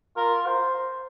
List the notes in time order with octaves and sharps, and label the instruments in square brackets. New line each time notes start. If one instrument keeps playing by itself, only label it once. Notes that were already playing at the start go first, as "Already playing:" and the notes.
[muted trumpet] F4 [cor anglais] A#4
[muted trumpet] C5